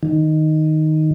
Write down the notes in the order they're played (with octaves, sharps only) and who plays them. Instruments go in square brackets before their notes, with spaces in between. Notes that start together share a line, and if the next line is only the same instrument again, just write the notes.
[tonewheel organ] D#3